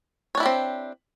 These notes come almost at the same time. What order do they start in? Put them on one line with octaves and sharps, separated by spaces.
C#5 D4 E4 G4 C4